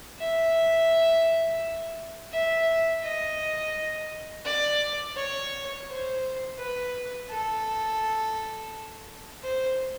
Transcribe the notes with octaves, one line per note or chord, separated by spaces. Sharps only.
E5
E5
D#5
D5
C#5
C5
B4
A4
C5